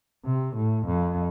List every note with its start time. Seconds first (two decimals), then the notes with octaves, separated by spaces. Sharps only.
0.26 C3
0.57 A2
0.87 F2